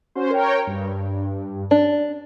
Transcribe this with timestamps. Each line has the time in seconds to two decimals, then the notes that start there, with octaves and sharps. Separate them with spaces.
0.15 C#4 F#4 C5
0.30 A#4 C#5 G5
0.67 G2
1.71 D4